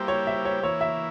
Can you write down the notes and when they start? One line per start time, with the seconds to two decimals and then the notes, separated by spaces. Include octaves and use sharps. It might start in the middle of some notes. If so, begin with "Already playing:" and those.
Already playing: G3 A#3 E4 G4 C5
0.08 C#5
0.27 E5
0.45 C#5
0.63 E3 A#3 E4 C#5
0.81 E5